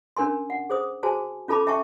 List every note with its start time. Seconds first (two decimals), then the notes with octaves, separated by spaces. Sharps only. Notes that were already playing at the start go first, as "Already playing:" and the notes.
0.17 C#4 D4 A#4 G#5 C6
0.50 F#5
0.70 G#4 C5 D#6
1.03 F#4 G#4 C5 G#5 A5
1.48 C#4 F4 A4 A5 B5 D6
1.66 C#4 E5 G5 A5 C#6